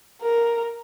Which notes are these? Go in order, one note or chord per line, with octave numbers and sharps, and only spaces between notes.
A#4